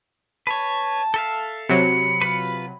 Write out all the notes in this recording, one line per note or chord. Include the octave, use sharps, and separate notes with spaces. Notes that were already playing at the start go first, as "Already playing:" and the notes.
B4 C#5 A5
A4 E5 F5
C3 F#3 B5 C#7
F4 B4